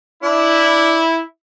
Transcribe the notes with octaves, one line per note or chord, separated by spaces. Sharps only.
D4 E4